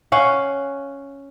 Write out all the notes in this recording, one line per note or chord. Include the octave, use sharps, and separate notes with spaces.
C#4 F5 F#5